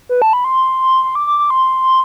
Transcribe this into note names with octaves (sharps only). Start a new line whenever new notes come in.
B4
A5
B5
C6
C6
D6
D6
D6
C6